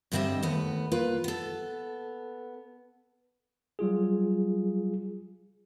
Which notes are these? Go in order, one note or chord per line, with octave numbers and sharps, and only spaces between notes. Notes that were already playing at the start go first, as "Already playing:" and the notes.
G2 D3 G3 C4 D#5 E5
D#2 A3 B3
A#3 F4 B4
B3 A4
F#3 G3 F4 G#4